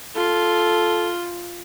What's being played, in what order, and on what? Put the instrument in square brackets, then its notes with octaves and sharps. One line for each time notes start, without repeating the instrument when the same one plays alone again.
[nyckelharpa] F4 [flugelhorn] A4